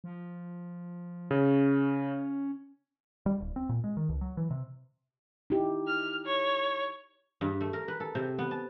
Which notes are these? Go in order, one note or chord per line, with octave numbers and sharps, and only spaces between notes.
F3
C#3 C#4
G3
D1
C4
A#2
G#3
D#3
C#2
F#3
E3
C3
D#4 E4 G4
F6
C#5
G2
A3
A#4
B4
A4
C3
B3
A5